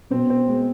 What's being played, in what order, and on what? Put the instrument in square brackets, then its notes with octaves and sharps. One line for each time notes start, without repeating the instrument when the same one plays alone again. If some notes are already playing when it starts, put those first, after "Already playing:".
[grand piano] B2 [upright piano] C4
[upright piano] C4
G#3